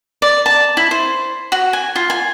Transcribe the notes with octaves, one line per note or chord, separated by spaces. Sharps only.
D5
A5
E4
C5
F#4
G#5
F4
G#5